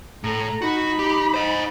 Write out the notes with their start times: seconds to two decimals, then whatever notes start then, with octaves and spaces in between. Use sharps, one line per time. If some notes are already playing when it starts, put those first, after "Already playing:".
0.24 A2 A4 A#5
0.62 D#4 F#4 B5
0.99 G4
1.34 C5 D#5